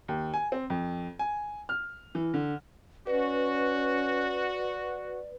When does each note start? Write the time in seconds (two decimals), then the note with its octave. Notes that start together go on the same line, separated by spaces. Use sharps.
0.08 D#2
0.34 G#5
0.52 C4
0.70 F2
1.19 G#5
1.69 F6
2.15 E3
2.34 D3
3.07 C#4 F#4 B4 D5